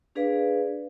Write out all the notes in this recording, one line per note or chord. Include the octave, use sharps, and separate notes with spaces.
D4 G#4 B4 D5 F5